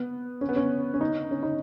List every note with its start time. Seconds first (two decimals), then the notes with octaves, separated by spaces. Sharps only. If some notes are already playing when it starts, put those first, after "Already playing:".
Already playing: B3
0.41 C#4
0.49 B3
0.56 C#4
0.94 C#4
1.01 D#4
1.31 C#4
1.43 D#4